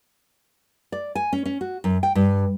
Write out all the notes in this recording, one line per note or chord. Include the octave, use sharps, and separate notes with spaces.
D5
G#5
C#4
C#4
F#4
F#2
G5
G2